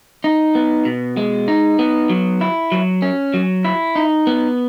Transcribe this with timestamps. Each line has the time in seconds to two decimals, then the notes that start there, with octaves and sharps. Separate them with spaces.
0.24 D#4
0.55 B3
0.85 B2
1.17 G#3
1.48 D#4
1.79 B3
2.09 F#3
2.41 E4
2.72 F#3
3.02 C#4
3.34 F#3
3.65 E4
3.96 D#4
4.27 B3